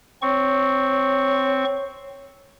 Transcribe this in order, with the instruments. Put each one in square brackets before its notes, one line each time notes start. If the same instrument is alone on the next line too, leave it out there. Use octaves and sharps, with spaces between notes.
[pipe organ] C4 C#6 [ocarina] C#5